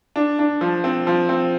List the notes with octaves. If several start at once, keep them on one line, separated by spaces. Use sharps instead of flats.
D4
D4
F3
C4
F3
C4